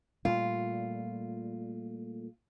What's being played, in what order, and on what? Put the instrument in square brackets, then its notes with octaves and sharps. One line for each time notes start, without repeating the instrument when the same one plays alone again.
[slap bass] A#2 G3 A3 [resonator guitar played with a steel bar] F4